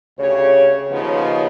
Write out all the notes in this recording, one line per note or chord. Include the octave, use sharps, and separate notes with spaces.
D2 C#3 G4 C#5
D#2 C#3 F3 B3 D#4 D#5